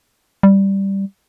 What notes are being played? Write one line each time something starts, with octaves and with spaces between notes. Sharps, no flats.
G3